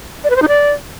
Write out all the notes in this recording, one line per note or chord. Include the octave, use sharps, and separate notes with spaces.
D5
B4
C5
D#4
D5